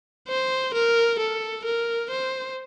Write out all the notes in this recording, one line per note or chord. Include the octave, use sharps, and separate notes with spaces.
C5
A#4
A4
A#4
C5